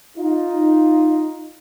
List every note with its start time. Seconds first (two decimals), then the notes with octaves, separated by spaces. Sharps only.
0.17 D#4 F4